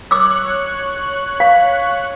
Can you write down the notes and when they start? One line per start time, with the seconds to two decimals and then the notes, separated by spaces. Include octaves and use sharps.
0.11 C#5 C#6 D6 E6 F#6
1.40 F5